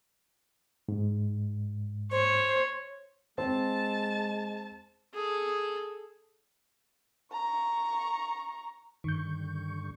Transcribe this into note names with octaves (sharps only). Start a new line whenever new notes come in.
G#2
C5 C#5
G#3 C4 A5
G#4 A4
A#5 C#6
G2 D3 D#3 C#6 G6